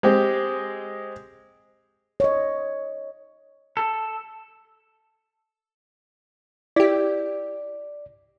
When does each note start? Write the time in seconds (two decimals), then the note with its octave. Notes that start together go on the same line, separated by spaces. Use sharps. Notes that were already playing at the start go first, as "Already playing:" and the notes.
0.03 G#3 C4 G4
2.20 C#5 D#5
3.77 A4
6.76 E4 G4 D5